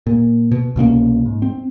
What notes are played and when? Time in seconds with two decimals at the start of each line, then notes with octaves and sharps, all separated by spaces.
0.07 A#2
0.52 B2
0.76 C2 B2 A#3 C#4
1.26 G#2
1.42 C4